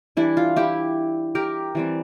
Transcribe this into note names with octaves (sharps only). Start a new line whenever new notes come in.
E3 G3 D4 E4
F4
E4 G4
G4 A#4
E3 G3 C4